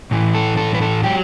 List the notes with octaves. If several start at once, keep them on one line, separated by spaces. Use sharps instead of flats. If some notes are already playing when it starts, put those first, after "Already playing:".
A2 E3
A4
A4
B4
A4
F#3 G4